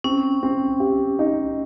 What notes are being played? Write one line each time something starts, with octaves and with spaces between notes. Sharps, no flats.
C4 C#4
C4
G4
D#4